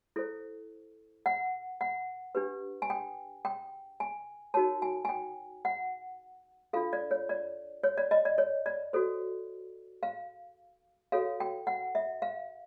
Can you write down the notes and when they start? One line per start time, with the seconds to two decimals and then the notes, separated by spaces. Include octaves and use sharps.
0.16 E4 A4 C5
1.26 F#5
1.81 F#5
2.35 D4 G4 B4
2.82 G#5
2.90 G5
3.45 G5
4.00 G#5
4.54 D#4 F#4 A#4 C#5 A5
4.82 G#5
5.05 G#5
5.09 G5
5.65 F#5
6.73 D4 F4 A4 F5
6.93 D5
7.11 C#5
7.29 D5
7.83 C#5
7.98 D5
8.11 D#5
8.25 D5
8.38 C#5
8.66 D5
8.93 F#4 A4 C5
10.03 F5
11.12 F#4 A4 C#5 F5
11.40 G5
11.67 F#5
11.95 E5
12.22 F5